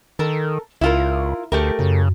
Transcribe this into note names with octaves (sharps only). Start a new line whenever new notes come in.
D#3 A4 A#4
C#2 E4 F4 A#4
D2 A3 G4 A#4
F#2 C#3